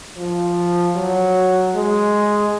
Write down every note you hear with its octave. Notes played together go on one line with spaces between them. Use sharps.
F3
F#3
G#3